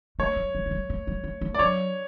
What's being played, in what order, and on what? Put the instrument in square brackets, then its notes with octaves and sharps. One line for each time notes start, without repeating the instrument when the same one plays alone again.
[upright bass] A3 [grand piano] C#5
[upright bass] G3
G3
A3
G3
A3
G3
A3
A3
[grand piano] D5
[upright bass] F#3 [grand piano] C#5